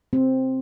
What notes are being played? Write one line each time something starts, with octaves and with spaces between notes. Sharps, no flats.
C4